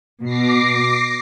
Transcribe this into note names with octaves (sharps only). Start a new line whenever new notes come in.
B2 D6 A#6 C7